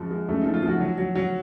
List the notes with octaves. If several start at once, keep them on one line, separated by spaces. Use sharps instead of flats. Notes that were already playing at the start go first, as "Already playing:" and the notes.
Already playing: F#2 F3 G#3
G#3
F#2 A3
F3 D#4
F4
F3 F#4
F#3
F#3
F#3